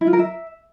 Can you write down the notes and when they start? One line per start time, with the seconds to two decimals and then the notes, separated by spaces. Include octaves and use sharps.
0.01 E4
0.07 F4
0.13 A#4
0.19 E5